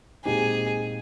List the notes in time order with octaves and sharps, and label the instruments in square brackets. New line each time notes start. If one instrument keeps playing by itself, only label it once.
[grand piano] A#2 G#3 C4 D#4 G4 [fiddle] G#4